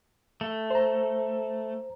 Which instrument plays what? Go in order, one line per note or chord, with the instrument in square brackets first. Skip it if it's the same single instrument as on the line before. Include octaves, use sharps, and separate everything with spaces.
[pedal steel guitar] A3
[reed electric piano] C5 A#5